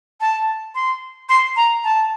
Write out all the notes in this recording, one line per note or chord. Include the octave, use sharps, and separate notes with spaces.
A5
C6
C6
A#5
A5